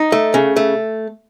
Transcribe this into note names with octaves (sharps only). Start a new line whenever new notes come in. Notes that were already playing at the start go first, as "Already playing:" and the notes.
Already playing: D#4
A3
C#3
A3